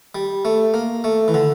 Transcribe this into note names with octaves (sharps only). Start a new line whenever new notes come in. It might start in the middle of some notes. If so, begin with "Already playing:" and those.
G3
A3
A#3
A3
E3
D3